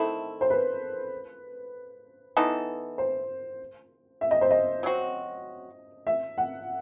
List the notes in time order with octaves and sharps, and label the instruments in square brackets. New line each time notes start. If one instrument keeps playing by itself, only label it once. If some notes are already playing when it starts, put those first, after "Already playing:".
Already playing: [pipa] D#3 A3 C4 E4 [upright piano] A4
[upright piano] C5
B4
[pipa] E3 B3 D#4 A4
[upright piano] C5
E5
D#5
C5
D#5
[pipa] F#3 C4 F#4
[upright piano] E5
F#5